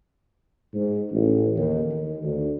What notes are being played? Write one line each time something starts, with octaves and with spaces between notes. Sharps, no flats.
G#2
A1
D#2
D#3
D2